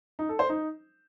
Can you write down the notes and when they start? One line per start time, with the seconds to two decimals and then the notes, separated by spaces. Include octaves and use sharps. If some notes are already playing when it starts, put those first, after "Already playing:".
0.19 D#4
0.29 A4
0.39 C5
0.49 D#4